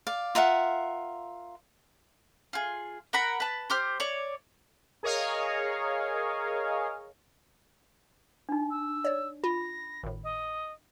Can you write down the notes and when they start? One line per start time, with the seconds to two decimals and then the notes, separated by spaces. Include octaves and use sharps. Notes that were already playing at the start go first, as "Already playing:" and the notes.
0.07 D5 F5
0.35 F4 A#4 E5 F#5
2.53 F4 G#4
3.13 A#4 F#5 A#5 B5
3.40 B4 A5
3.70 G4 C5 F6
4.00 C#5 D5
5.03 G#4 A#4 C#5 D#5 F5
8.49 D4 D#4
8.71 E6
9.04 C#5 D5
9.44 F4 B5 A#6
10.03 G#1 A2
10.24 D#5